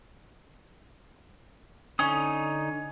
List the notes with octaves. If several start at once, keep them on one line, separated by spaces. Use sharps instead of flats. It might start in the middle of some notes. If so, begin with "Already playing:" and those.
D3 C#4 D#4 D#6